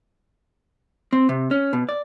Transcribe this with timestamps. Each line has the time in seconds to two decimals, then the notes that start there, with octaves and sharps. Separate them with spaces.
1.13 C4
1.29 C3
1.51 C#4
1.73 B2
1.89 D5